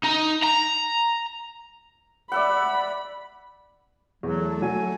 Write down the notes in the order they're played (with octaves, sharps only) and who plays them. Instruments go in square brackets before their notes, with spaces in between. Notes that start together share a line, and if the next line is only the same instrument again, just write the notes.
[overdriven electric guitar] D#4
A#5
[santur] D5 E5 F#5 [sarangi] B5
[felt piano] E2 [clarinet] F#3 [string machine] A3 A4
[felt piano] F#3 [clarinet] G#5